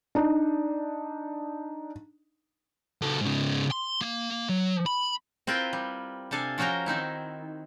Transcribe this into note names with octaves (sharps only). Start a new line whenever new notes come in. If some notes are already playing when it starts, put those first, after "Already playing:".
D4 D#4
C#2 A4
G#2 C#3
C6
A#3
F#3
B5
C4 E4 F4 A#4 B4 G5
G3
C3 D4 A4 F5 G#5
F3 C#4 F#4 A#4 G5 A#5
D#3 C4 D#4 E4